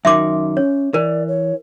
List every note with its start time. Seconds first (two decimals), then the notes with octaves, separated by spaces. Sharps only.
0.05 F#2 D#3 E5 C6 D6
0.57 C#4 C#5
0.94 E3 A#4 D5
1.28 C#5